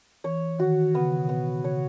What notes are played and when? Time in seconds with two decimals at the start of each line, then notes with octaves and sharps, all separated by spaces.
0.24 E3 C#5
0.59 D#3 F#4
0.94 C#3 B3
1.18 B2
1.29 B3
1.64 C#3 C#5